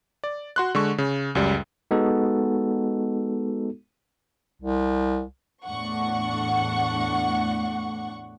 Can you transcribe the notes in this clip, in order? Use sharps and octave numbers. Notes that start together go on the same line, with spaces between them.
D5
F#4 C6 F#6
D3 G#3 C#6
C#3
C#2 F#2 G3
G#3 B3 D#4 F#4 A4
C2
E2 A2 D4 F#5 C#6